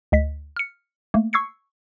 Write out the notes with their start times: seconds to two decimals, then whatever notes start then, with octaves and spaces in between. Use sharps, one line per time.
0.12 D2 D#5 B6
0.57 F6 C#7
1.14 A3 A#3
1.33 C#6 E6 G#6 C7 C#7